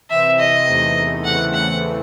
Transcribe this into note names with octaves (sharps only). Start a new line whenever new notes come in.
C3 E3 C4 E5
D#5
E2 C3 E3 A3 D#4
E2 C#3 E3 A3 C4 F#5
F#5